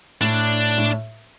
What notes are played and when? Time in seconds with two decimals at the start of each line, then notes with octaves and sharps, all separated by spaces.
0.21 A2 D4
0.78 A2